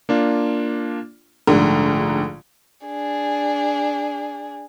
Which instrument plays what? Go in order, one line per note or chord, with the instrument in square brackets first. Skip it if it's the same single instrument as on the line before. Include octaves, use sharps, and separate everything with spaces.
[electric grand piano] A#3 D4 F4
[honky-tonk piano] A#1 G#2 D3 [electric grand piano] A3 A#5
[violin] D4 G#4